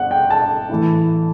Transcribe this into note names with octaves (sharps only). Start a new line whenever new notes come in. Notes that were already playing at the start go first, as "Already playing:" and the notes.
Already playing: G1 F#5
G5
A5
A2 E3 A3 E4